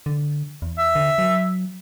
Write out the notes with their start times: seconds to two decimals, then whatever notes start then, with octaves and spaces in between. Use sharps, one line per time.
0.06 D3
0.62 E2
0.79 E5
0.95 D3
1.18 F#3